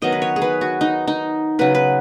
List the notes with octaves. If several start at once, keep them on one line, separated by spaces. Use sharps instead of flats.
D#3 F#3 B3 D#5
B4
C#5
G#4
B4
F#4
D#4
D#4
C#3 F#3 B3 B4
B4